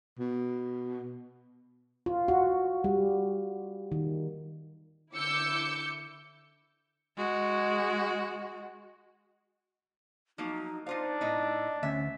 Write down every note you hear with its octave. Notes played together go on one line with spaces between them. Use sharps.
B2
F4
F#4
G3
D#3
D3 E4 D6 E6 G6 C#7
G#3 F#4
F3 F#3 A#3 D#4
D4 D#4 F4 C5 F5
A2 D#4 D#5
D2 C#4 E5